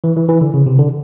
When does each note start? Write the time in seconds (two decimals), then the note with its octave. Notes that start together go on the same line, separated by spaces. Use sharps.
0.04 E3
0.16 E3
0.29 E3
0.41 D3
0.54 C#3
0.66 C3
0.79 D3